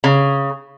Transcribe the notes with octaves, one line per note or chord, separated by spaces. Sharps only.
C#3